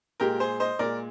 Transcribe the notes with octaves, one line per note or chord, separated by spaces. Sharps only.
A#2 G#3 G4 A#4
G#4 C5
C5 D#5
A#2 G#3 A#4 D5